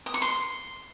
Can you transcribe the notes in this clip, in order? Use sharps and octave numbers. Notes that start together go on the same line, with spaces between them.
D#6
C#6
C6